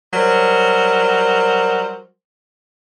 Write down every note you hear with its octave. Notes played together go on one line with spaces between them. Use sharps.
F#3 G3 A#4 C5